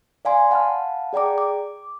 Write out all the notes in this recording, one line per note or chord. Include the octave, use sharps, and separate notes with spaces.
D5 F5 G#5 C6
F5 F#5 A5 B5 F6
G#4 D5 G5 A#5 D6
D6